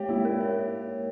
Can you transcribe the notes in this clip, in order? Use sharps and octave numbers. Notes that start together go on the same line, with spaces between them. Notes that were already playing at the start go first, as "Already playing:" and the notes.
Already playing: G#3 G4 C#5
A#3 E4
E4 A#4
C#5